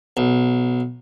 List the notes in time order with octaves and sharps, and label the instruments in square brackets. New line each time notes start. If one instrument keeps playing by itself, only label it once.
[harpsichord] B1